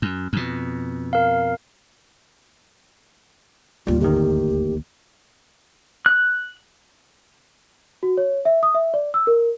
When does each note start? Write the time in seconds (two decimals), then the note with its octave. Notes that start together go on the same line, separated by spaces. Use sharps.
0.02 F#2
0.33 F2 B2
1.13 A#4 F5
3.87 D1 D#2 G3 F4
4.00 G1 D2 D#3 G4
6.06 F#6
8.03 F#4
8.17 C#5
8.45 E5
8.63 D#6
8.75 E5
8.94 D5
9.14 E6
9.27 A#4